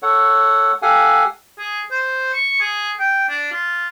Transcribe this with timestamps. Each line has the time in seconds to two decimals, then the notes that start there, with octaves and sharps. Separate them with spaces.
0.03 A4 C#5 F#5
0.82 G4 A4 F5 F#5 G#5
1.59 G#4
1.91 C5
2.34 C#6
2.61 G#4
3.00 G5
3.29 D4
3.52 F4